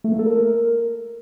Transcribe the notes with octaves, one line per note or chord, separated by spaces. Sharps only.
A3
A#3
A4
A#4